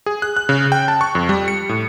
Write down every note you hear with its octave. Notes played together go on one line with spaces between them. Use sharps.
G#4
F#6
F#6
C#3
G5
A5
C#6
F2
G3
C#7
A2